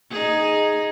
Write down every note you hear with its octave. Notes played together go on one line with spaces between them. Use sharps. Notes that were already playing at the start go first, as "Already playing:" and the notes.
D#4 G#4